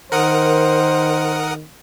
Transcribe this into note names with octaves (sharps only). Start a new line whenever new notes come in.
D#3 A#4 C5 F#5 D#6